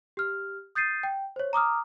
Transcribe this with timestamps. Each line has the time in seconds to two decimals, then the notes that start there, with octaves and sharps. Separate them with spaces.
0.17 G4 F6
0.75 D#6 G6 A6 C7 D#7
1.03 G5
1.36 C5 C#5
1.53 A#5 D6 D#6 F6